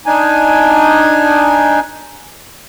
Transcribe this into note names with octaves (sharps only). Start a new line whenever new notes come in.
D4 D#4 G#5